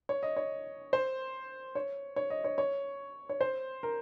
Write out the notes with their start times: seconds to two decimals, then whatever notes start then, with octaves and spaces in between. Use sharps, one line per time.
0.09 C#5
0.23 D#5
0.37 C#5
0.93 C5
1.75 C#5
2.16 C#5
2.30 D#5
2.44 C#5
2.58 C#5
3.29 C#5
3.41 C5
3.83 A#4